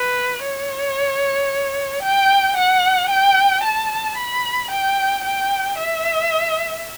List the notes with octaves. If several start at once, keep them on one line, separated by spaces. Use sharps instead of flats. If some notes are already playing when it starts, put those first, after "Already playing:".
Already playing: B4
C#5
G5
F#5
G5
A5
B5
G5
G5
E5